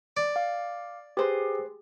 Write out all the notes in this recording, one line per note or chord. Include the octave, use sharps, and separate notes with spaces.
D5
F5 D6
G4 G#4 B4 C5